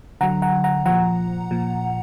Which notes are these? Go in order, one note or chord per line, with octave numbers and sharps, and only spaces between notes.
D3 F#3 F#5 A#5
F#5 A#5
F#5 A#5
A#2 F3 F#5 A#5
A#2 F3